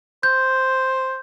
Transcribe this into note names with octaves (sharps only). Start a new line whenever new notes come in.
C5 G6